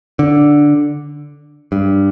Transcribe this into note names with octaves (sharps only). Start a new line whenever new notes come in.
D3
G2